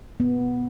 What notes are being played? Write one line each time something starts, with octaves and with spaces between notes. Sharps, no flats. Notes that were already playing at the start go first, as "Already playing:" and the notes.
B3